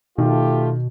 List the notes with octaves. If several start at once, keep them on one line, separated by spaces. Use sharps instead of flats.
B2 D#3 A3 F4 G4